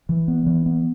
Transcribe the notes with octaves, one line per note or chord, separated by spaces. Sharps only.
E3
B3
E3
B3